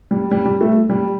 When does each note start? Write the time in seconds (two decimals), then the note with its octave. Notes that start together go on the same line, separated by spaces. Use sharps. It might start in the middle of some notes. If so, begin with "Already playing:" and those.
0.11 G3
0.31 G3
0.45 G3
0.61 A3
0.89 G3